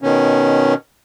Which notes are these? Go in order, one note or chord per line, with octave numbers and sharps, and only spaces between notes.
B2 D#3 C#4